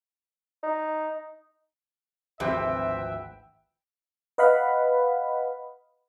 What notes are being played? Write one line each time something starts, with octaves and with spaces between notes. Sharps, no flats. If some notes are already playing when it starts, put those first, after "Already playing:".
D#4
G#1 D2 C3 F3 B4 E5 G5
B4 D#5 F5 F#5 B5